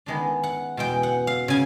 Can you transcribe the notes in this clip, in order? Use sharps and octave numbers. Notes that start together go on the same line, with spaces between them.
D#3 G#3 B3 D4
F#5
E2 B2 G#3 G5
F#5
F5
C#3 G#5